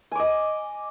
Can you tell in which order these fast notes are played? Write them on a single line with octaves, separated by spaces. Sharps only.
G#5 D6 D#5